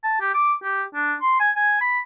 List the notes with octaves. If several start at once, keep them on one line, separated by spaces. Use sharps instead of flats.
A5
G4
D6
G4
D4
C6
G#5
G#5
B5